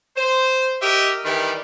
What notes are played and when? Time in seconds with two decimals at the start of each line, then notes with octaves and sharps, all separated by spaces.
0.17 C5
0.82 G4 A#4 D#5 E5
1.25 D#3 E3 G3